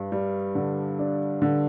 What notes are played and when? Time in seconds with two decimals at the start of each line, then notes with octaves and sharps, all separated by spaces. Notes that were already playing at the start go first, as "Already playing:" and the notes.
Already playing: G2 G3
0.12 G3
0.55 D3
0.99 D4
1.42 D3